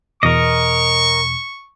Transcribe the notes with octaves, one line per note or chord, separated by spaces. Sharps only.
E2 B2 A#4 D#5 C#6